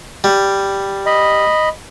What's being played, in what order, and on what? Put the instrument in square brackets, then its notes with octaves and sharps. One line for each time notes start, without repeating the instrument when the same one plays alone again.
[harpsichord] G3
[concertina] D#5 B5